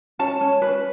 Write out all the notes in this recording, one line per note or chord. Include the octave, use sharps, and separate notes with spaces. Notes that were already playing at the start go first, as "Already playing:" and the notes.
C#4 A5
C#4
B4